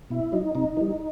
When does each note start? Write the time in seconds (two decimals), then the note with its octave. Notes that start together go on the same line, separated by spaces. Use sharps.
0.10 B2 E4
0.32 F#3 D#4
0.55 C3 D#4
0.77 E3 G3